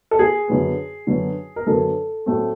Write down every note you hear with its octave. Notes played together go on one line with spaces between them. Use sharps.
A4
G#4
F#2 D3 F#3 B3
F#2 D3 F#3 B3
A#4
F#2 D3 F#3 B3 A4
A2 F#3 A3 C4